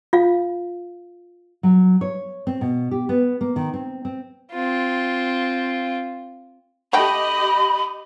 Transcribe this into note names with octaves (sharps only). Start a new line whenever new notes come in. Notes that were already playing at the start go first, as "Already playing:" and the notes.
F4 F5
F#3
C#5
C4
B2
G4
B3
A#3
D#3
C4
C4
C4 F4
D3 A3 G4 D#5 G5 B5